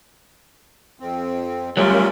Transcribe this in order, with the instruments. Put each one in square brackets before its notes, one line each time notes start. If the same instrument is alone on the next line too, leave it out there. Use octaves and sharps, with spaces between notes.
[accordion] F2 C4
[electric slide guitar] F#3 G3 A3 [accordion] C#4 F4 A#4